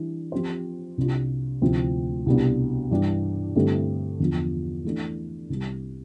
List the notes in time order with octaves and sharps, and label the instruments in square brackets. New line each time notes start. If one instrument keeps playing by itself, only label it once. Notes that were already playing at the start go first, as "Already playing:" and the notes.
Already playing: [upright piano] E3 G3 D4
F3 C4 G4 C5
C2 C3 G3 D4 F4
D2 C3 F3 C4 E4
C2 B2 G3 B3 D4
G2 E3 G3 D4 G4
G2 D3 A3 C4 E4
E2 D3 F3
E3 A3 D4
C2 C3 G3